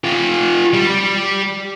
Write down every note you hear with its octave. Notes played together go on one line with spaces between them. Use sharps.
F4 G4
G3